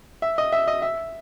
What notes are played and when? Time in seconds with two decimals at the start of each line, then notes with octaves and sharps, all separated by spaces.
0.22 E5
0.38 D#5
0.52 E5
0.68 D#5
0.82 E5